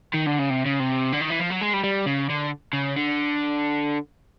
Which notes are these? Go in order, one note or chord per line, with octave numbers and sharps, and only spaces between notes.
D#3
D3
C#3
C3
C#3
C3
D3
D#3
E3
F3
F#3
G#3
G3
G3
C#3
D3
C#3
D3